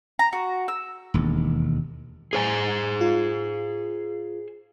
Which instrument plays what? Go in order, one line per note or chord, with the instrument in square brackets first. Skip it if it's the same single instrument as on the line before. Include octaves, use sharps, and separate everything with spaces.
[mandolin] A#5
F#4
E6
[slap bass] E1 D#2
[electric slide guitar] G#4 C5 G#5
[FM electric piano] F4